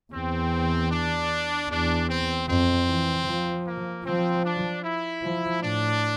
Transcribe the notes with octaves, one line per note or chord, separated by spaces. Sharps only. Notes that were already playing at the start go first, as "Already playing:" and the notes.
E2 C4
D4
E2 D4
C4
F2 C4
E3
F3
A#3
F3 C4
D4
E4
F3
A2 D4